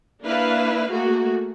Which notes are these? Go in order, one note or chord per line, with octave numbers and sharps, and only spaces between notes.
A#3 D4 E4 B4 F5
A3 A#3 F#4 G#4